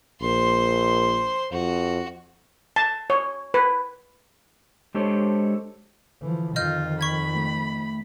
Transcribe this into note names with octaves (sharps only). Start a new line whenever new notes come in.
A#1 C5 C6
F2 F#4
A5
C#5
B4
G#3 D4 G4 A4 C5 C#5
D3 E3 F3
F2 D#3 F4 D#5 F6 G6
B5 C#6 G#6
A3